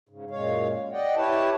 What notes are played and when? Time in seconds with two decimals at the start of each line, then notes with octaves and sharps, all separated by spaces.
0.09 G#2 C#3
0.31 F#2 A#2 G#3 C#5 F5
0.92 D5 D#5 F#5 G5
1.16 E4 G4 B4 C#5 A5